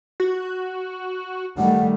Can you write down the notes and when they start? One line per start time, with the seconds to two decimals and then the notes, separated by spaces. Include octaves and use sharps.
0.20 F#4
1.58 D#3 G3 A3 F#5